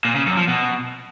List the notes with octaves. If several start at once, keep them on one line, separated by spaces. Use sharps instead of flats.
A#2
C#3
F#2
F3
B2